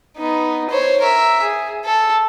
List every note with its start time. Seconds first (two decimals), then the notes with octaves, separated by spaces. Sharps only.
0.17 B3 D#4
0.70 C5 C#5
1.01 A#4 E5
1.42 G#4
1.85 A4